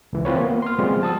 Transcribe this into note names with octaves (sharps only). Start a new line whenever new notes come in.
C#2 E3
E3 C4 F4 B4 C#5
A#3 B3
C6 F6
F3 G3 G#3 B3 C4 F4
A5 D#6 E6